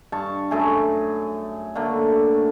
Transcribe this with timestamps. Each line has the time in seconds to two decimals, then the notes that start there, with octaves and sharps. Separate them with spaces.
0.12 G2 A5 C#6
0.51 F#2 A3 G#4
1.75 D3 A3 A#3